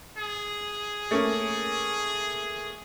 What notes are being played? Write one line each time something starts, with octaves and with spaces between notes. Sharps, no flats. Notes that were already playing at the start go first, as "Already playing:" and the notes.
G#4
A3 A#3 C#4